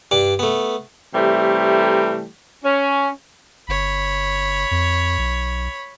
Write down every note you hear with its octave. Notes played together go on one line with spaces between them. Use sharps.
G2 D4 D6
A3 B3
C3 E3 G3 A3
C#4
G1 C#5 B5
F2
B1